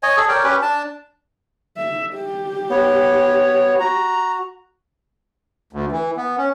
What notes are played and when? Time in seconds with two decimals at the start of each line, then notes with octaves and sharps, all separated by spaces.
0.03 C#5 D#5 G#5
0.17 G#4 A4
0.29 A#4 C#5 D5 G5
0.43 C#4 G4 B4
0.62 D4 A5
1.77 E5
2.14 G4
2.70 B3 C#5
3.79 F#4 A#5
5.73 D2
5.92 E3
6.17 B3
6.38 C#4